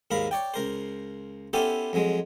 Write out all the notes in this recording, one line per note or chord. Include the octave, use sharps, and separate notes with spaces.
D#2 G#2 A#4 F5 B5
C#5 D5 G5
C#2 A#4 C5
B3 C#4 E4 G4 A4 C5
F2 F#3 G#3